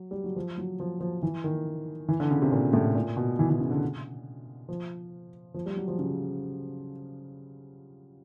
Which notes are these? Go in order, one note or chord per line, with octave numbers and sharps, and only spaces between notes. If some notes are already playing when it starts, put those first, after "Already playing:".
Already playing: F#3
G3
F#3
F3
F#3
F3
F3
E3
D#3
E3
D3
C#3
C3
A#2
A2
A#2
B2
E3
E3
C#3
D3
F3
F3
G3
F#3
F3
C#3